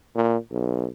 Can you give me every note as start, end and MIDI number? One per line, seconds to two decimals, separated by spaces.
0.15 0.37 46
0.51 0.86 35